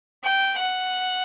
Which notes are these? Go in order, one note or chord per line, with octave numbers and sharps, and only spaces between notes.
G5
F#5